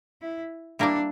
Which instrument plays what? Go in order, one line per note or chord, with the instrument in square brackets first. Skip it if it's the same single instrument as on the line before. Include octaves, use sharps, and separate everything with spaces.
[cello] E4
[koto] G3 A#3 E4 A#4 D5 [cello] D4